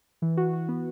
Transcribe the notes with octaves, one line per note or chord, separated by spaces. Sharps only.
E3
F#4
F#4
B3